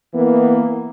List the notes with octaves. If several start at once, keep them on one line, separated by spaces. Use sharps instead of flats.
E3 A#3 B3